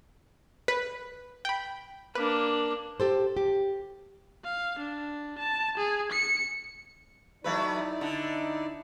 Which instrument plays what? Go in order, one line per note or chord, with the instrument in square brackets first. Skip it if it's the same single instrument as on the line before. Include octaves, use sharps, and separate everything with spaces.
[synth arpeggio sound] B4
G5 B5
[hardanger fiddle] A#3 D4 [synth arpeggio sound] B4
[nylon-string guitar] G4 A4 C5
G4
[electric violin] F5
D4
A5
G#4
C#7
[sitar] F#3 A3 B4 [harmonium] D#4 E4 D5
[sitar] D3